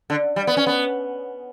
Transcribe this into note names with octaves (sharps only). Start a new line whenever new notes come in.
D3
G3
B3
C#4
B3